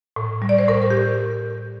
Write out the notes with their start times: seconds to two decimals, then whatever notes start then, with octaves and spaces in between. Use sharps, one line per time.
0.16 A2
0.42 G3
0.49 D5
0.58 C5
0.68 A2 A#4
0.82 A#4
0.90 G4